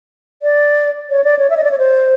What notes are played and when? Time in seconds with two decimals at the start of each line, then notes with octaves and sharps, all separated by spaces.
0.43 D5
1.10 C#5
1.24 D5
1.39 C#5
1.50 E5
1.57 D#5
1.64 D5
1.71 C#5
1.78 C5